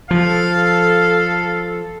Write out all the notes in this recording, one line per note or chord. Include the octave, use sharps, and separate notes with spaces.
F3 A4 F5